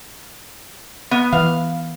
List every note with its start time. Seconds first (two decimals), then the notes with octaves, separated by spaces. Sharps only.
1.11 B3
1.32 E3 F5